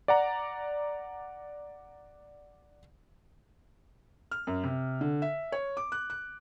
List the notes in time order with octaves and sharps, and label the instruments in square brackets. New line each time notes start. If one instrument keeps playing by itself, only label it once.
[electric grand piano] D5 F#5 A#5
[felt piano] F6
F#2
C3
D3
E5
C#5
D6
F#6
F#6